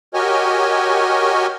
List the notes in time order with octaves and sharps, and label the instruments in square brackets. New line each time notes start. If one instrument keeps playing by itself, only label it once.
[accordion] F#4 G4 A#4 C#5 D#5 G#5